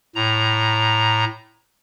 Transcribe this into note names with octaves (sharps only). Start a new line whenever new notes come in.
A2 A#5